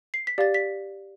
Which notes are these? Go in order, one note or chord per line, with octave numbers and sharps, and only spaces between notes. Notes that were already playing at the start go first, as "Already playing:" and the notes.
C7
B6
G4 D5 F5 A6
B6